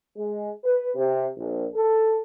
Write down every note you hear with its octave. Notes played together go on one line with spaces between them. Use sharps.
G#3
B4
C3
A#1
A4